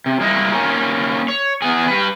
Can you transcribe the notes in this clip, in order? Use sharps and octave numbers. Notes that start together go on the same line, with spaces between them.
C3
G3 G#3 A#3 E4 D#5
A#3 C#4 D#4
C#5
E2 B3 G#4
G3 B4